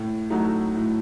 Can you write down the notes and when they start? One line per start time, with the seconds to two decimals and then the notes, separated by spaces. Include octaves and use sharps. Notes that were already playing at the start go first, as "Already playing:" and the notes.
Already playing: A2
0.30 F#3 A3 D#4 F#4
0.75 A2